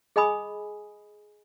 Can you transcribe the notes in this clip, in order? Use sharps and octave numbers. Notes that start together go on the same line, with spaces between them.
G#4 D#5 G#5 B5 D#6